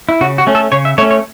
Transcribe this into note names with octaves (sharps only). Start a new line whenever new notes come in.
E4
C#3 F#4
F#4
A3 C#4
A4
C#3 C#5
E5
A3 C#4 C#5
C#5